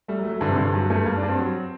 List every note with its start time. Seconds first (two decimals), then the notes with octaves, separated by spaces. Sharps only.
0.08 G3 A3
0.19 F#3
0.25 A3
0.30 F#3
0.41 G2 D3
0.48 C3
0.55 G2 D3
0.74 G2 F#3
0.90 G2 A3
1.06 G2 A#3
1.17 D4
1.23 G2
1.28 C4
1.39 F#3